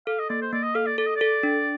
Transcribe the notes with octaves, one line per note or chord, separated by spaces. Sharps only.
A4 F5
D#5
A#3 D5
C5
A#3 D5
D#5
A4 F5
D5
A4 D5
D#5
A4 D5
D4